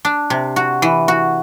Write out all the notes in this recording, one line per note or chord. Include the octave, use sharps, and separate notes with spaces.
D4
C3
F#4
E3
F#4